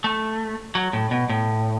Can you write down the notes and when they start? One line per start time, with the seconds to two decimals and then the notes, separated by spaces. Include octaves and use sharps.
0.04 A3
0.75 F#3
0.93 A2
1.11 B2
1.29 A2